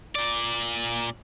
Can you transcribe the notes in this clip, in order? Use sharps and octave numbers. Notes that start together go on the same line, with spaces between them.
A#2 D5